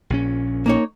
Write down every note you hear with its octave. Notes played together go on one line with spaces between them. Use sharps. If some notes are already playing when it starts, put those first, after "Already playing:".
A#1 A#2 C#4
A#3 D#4 C#5